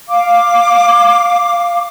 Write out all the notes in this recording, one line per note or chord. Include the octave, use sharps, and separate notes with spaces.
F5 D6